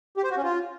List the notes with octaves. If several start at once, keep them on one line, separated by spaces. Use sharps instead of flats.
G4
C5
F#4
C#4
F4